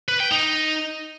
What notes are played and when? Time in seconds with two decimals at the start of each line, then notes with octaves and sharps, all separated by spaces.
0.09 B4
0.20 G5
0.32 D#4